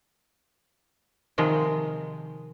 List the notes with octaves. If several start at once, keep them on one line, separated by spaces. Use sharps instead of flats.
C3 D#3 F3 G#3